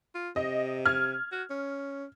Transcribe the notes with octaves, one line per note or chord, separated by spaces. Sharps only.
F4
C3 D#5
F6 G#6
F#4
C#4